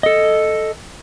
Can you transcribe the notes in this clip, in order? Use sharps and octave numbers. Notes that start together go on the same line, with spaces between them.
A4 D#5